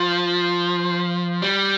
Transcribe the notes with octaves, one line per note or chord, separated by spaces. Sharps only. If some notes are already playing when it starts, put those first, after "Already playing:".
Already playing: F3
G3